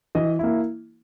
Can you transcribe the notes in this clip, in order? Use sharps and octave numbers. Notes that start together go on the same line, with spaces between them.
E3 D#5
A#3 E4